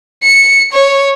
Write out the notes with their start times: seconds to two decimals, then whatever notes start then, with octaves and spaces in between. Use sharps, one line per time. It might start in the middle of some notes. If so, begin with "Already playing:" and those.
0.24 C#7
0.73 C#5